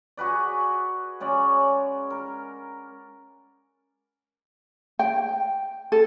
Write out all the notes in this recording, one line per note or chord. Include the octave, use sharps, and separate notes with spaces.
F#4 G#4 B4 D5
G#3 C#4 D5
A#4
G5
A4